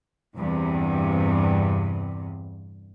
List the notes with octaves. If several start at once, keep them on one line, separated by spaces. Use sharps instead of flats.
E2 G2 C3